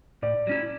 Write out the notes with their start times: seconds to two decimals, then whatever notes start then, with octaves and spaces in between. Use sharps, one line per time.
0.22 A2 D5
0.47 F#3 C#4 E4